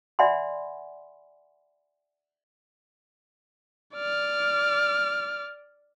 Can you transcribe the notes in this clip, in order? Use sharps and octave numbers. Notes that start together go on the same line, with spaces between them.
D5 E5 F#5 G#5 B5 C6
D5 F6